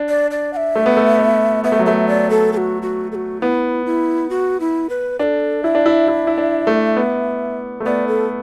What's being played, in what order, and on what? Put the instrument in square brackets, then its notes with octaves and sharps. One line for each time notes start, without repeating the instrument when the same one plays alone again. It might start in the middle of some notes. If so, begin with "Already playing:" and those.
Already playing: [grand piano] D4
[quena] D5
D5
F#5
E5
[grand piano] A3
B3
A3
B3
[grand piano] B3 [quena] E5
[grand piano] A3
F#3
[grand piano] A3 [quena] E5
[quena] D5
A4
A4
F#4
F#4
A4
F#4
[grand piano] B3 [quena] E4
[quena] E4
F#4
E4
B4
[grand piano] D4 [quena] A4 B4
[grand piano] E4 [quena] E5
[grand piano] D4
E4
E4
E4
D4
A3
B3
A3
[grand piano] B3 [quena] D5
[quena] A4